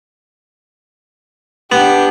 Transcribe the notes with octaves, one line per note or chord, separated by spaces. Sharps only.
B3 D4 G4